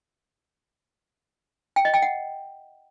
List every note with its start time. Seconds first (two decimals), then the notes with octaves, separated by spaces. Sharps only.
1.76 G5
1.85 D#5
1.94 G5
2.02 F#5